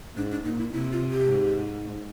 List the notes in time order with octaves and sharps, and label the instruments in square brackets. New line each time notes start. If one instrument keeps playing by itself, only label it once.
[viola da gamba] G#2 [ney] D4
[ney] D4
[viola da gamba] A#2 [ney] D#4
[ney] E4
[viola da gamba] C3 [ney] E4
[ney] F4
G4
[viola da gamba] G#2